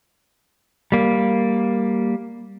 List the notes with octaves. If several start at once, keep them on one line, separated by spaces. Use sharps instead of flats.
G3 A#3